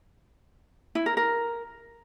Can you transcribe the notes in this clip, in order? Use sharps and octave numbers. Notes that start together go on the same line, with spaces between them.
E4
A#4
A#4